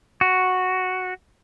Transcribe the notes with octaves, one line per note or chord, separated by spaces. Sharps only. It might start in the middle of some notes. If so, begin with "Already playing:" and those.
F#4